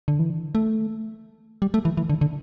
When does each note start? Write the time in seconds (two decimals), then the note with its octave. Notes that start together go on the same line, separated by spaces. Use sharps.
0.08 D3
0.19 E3
0.55 A3
1.62 G3
1.74 A3
1.85 E3
1.97 E3
2.10 D3
2.21 D3